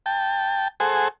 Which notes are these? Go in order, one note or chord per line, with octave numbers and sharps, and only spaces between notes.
G5 A5
G#4 A4 C5 F#5 G#5